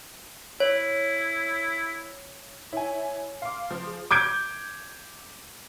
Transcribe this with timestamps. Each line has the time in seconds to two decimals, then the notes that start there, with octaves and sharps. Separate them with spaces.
0.60 E4 C#5
2.72 E4 C#5 G#5
3.42 F5 C6 D6
3.71 F3 C5
3.87 G#4
4.11 D6 G6 G#6 D7